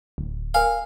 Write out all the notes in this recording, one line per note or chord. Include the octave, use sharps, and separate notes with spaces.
D1
A#4 F5 G#5